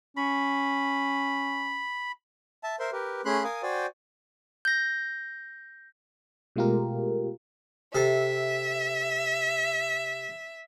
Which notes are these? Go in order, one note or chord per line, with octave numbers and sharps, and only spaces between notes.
C#4 B5
E5 A5
A#4 C5 E5 C6
G4 A#4 B4
A3 C#4 G#4 B5 C6 F#6
A#4 F5 G#5 D#6
F#4 C5 D5 G5 G#5
G6 A#6
B2 G#3 A3 F4 G4 A#4
C3 A4 E5